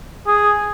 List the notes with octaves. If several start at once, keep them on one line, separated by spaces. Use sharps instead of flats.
G#4